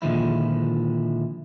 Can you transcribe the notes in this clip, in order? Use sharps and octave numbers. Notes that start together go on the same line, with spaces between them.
A#2 D3 D#3 F3 G#3 E4